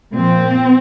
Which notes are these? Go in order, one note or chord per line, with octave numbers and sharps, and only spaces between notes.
A#2 F3 C4